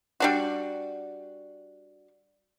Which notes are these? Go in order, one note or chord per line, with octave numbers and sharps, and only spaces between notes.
G3 D4 F#4